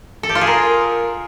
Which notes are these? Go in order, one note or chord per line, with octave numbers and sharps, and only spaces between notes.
A4
G4
F4
G#4
A#4